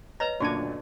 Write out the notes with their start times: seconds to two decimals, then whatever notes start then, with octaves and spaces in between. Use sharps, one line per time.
0.20 B4 C#5 D#5 A#5
0.40 F#1 D2 A#2 D4 F#4 C#5 D5 A5